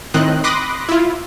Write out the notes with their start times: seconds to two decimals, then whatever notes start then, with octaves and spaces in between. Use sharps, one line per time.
0.14 A2 D#3 C4 D#5 F#6
0.44 B5 C6 D6 D#6 F#6 A#6
0.89 E4 F4